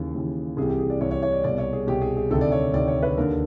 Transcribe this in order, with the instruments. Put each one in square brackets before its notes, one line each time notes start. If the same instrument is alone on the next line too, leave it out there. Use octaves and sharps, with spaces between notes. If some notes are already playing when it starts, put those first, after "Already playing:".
Already playing: [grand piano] D#2 C#3 E3
D#2 C#3 E3
C2 C3 E3 G#4
G4
G#4
D5
C2 C3 E3 C#5
C#5
C#5
D5
C2 B2 D5
C#5
G#4
C2 B2 G4
G#4
G#4
D2 C3 D#3 A4
D5
C#5
D2 C3 D#3 D5
C#5
B4
D#2 D3 A#4